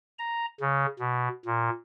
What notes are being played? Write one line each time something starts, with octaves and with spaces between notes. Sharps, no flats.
A#5
C#3
B2
A#2